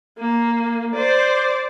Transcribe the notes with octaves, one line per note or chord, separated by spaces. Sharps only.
A#3
C5 D5